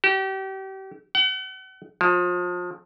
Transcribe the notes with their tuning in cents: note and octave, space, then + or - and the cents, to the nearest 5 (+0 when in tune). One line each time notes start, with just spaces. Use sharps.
G4 -35
F#5 +40
F3 +30